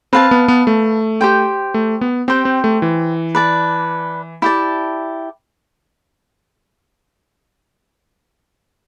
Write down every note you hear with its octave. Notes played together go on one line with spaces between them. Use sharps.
C4 B4 F5 A5
B3
B3
A3
G4 C5 G5
A3
B3
C4 G4 C5 G5
C4
A3
E3
B4 D5 A5
E4 G4 D5 A5